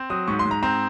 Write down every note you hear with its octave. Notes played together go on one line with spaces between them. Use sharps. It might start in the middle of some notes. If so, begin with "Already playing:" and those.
Already playing: C4
F#3 D#6
G#2 C#6
C6
G#2
A#5
C4 A#5